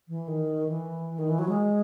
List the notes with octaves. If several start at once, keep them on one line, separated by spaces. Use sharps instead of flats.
E3
D#3
E3
D#3
E3
F#3
G#3